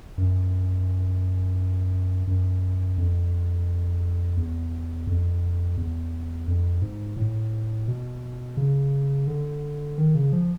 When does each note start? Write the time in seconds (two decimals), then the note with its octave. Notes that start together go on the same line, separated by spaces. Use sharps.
0.18 F#2
2.27 F#2
2.98 F2
4.37 E2
5.07 F2
5.77 E2
6.48 F2
6.82 G#2
7.17 A2
7.88 B2
8.57 C#3
9.27 D3
9.97 D#3
10.15 C#3
10.32 F3